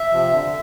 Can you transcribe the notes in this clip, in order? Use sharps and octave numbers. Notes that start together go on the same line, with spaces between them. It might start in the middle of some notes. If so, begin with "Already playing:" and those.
Already playing: E5
C3 F3
D3